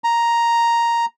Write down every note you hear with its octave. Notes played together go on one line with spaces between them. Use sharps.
A#5